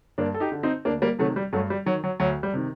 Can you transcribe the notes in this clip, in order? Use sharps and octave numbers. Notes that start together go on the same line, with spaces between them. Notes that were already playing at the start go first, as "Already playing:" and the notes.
G2 A#3 D4
A4
D#4 G4
D3
C4 D#4
D2 A#3 D4
G3 A#3
C3 D#3 F#3 A3
G3
G2 F#3 A3
G3
D#3 F#3
F#3
D2 F#3
G3
C3 D#3